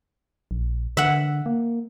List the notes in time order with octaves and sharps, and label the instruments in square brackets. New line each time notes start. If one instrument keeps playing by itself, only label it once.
[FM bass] A#1
[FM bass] D3 [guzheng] E5 F#5
[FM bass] A#3